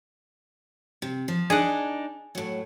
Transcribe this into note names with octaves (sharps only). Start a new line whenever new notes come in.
C3
F3
D4 D#4 G#4 F#5
A2 F#3